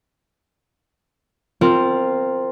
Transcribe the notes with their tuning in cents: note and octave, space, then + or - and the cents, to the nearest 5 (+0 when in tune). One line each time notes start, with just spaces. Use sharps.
C4 +0 F4 +0 A#4 -25